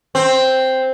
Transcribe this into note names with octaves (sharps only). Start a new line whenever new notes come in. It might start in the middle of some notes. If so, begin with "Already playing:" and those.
C4